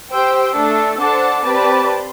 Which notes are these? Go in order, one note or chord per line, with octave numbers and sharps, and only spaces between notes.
G4 C5 G5 E6
A3 D4 A4
E6
D4 A4 C5 F#5 A5 D6
C4 G4 B4 D5 A5
C6